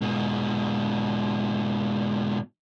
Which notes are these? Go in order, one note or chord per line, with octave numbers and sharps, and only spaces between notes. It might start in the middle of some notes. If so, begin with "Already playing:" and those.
G#2 B2